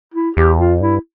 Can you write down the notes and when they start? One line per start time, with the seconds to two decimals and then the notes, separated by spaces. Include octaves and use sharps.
0.14 E4
0.37 E2 G4
0.59 F2 F4
0.81 G2 E4